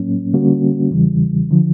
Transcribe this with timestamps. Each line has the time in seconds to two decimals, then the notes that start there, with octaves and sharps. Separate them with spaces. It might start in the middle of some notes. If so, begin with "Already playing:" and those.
Already playing: A2 F#3 A#3 C#4
0.34 D3 G3 A#3 C#4 F#4
0.91 E2 C#3 E3 G3
1.51 D3 F3